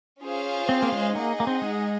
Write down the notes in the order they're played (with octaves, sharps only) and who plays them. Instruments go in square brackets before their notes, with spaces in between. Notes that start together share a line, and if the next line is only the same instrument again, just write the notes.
[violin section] C#4 F4 G#4 C5 F5
[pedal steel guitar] C4
A#3
G#3
[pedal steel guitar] A#3 [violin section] D#4 G#4 D#5 F#5
[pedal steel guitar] A#3
C4
G#3